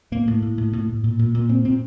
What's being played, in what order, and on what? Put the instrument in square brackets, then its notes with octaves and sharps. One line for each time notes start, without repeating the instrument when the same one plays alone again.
[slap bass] A2 A#3
A2
A2
A2
A2
A2
A#2
A#2
A#2
A#2 C4
A#2 C4